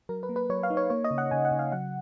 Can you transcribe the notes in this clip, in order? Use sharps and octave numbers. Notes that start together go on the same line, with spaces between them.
F#3 A#4
B4
A#3
B4
F#3 C#5
F5
D#4
C#5
A#3 C#5
D#5
C#3
F#5
C#3 G#5
F#5
C#3
F5
F#3 F#5